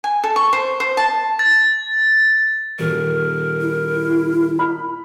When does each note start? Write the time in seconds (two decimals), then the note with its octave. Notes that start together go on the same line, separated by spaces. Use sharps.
0.04 G#5
0.24 A4
0.36 C#6
0.53 C5
0.80 C5
0.97 A5
1.39 A6
2.79 D#1 A#4
3.61 E4
4.59 B5 F6